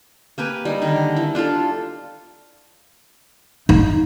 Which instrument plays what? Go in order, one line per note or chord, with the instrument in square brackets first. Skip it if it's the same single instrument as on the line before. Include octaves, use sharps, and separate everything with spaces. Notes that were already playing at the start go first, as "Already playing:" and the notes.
[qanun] A#3 G4 B4 G#5
G3 D#4 G#4
D3 D#3
E4
D4 F4 G4 A4
[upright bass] D#4